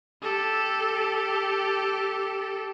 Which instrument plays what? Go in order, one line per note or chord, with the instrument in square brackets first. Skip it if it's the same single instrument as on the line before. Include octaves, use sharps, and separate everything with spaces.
[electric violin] G4 A4